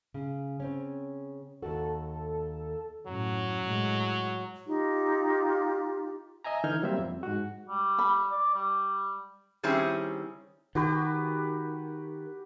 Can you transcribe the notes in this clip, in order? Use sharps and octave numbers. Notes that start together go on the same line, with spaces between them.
C#3
C#3 C4 C#4
D#2 F#4 A4
F#2 A2 F#3
A2 G#3
D#4 F4 G4
D#5 E5 G#5 A#5
D3 E3 D#4 F6 G6 G#6
F#3 G3 A#3 C4 E5
F2
G#2 F#4
G3
B5
D5
G3
D#3 G3 C4 C#4 E4 G#4
D#3 F#4 G4 B4